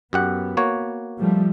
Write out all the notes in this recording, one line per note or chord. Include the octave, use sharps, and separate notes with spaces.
F#2 B3 G4 F#5
A#3 F#4 C#5
F3 G3 A3